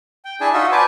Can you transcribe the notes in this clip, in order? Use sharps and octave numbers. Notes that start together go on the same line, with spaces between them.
G5
D4 E4 G#4 G#5 A5
D#4 F4 F#4 D#5 E5
B4 C5 D5 G#5 A5